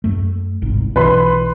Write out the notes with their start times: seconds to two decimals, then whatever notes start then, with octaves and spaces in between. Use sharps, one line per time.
0.04 F#2 A3
0.62 G1 C2 G#2
0.96 B1 E3 B4 C6